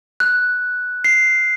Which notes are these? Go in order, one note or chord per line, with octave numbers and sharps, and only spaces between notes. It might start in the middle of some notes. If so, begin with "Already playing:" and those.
F#6
C7